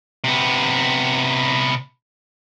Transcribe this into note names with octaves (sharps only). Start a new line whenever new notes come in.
C3 B3